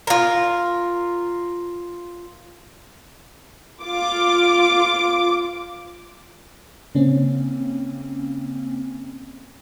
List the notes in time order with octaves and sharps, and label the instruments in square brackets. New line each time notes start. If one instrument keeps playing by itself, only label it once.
[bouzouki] F4 A#4
[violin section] F4 D6
[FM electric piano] C#3 A#3 C4 C#4